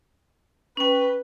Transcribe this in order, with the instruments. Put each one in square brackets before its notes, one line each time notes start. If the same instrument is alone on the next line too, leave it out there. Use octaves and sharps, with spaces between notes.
[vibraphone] C#4 G5 [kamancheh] B4